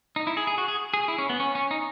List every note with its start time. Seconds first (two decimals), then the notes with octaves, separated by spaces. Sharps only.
0.16 D#4
0.27 E4
0.37 G#4
0.47 G#4
0.58 F#4
0.68 G#4
0.94 G#4
1.08 E4
1.18 C#4
1.30 B3
1.40 C#4
1.55 C#4
1.71 D#4